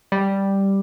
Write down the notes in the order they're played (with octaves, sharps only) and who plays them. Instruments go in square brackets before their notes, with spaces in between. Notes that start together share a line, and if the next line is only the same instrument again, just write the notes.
[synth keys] G3